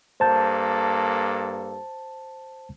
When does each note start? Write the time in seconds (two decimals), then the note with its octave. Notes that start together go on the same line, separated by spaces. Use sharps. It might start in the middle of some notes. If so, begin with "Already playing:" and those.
0.20 G2 A#3 A4 C5 A5 G6